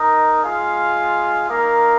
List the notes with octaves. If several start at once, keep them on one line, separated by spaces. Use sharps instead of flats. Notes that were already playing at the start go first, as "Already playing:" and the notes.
Already playing: D#4 A#4 D#5
G#3 F4 G#4 F5
A#3 D#4 A#4 F5